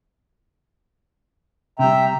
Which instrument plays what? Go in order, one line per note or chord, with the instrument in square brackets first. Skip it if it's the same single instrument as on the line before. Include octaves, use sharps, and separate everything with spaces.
[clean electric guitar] C3 G3 [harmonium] E5 G5 A#5